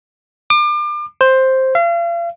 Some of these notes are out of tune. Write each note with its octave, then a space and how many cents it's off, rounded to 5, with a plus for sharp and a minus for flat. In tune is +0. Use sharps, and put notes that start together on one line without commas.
D6 +35
C5 +5
F5 -40